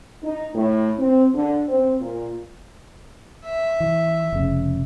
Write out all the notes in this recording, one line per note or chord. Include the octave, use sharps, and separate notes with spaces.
D#4
A2
C4
D3
C4
A#2
E5
E3
F1 C#3